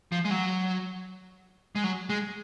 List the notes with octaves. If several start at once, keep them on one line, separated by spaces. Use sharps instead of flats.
F3
G#3
F#3
G#3
F#3
G#3